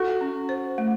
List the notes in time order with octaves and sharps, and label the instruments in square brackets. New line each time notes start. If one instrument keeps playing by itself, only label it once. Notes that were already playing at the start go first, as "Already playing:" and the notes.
Already playing: [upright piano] F#4 [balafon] A4
[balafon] C#4
C5
A3